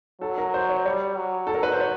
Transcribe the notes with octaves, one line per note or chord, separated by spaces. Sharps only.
F#3 A4
A#4
C5
C#5
G3 C#5
F#3
A4
A#4
B4
C5
C#5